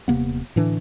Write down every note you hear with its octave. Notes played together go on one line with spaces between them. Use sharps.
D#1 C3 A#3 B3
A2 D3 E3 D4